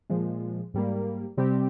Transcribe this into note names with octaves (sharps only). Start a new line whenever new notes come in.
A#2 F3 G#3
G#2 G3 A#3
C3 G3 C4 G4